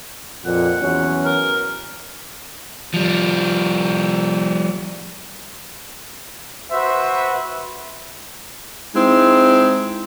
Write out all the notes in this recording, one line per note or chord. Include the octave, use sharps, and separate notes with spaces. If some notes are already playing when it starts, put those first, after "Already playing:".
F2 A#2 F#5
E2 F#3 C#4
A#4
F3 G3
F#4 B4 C5 E5
G#3 C4 D#4 E4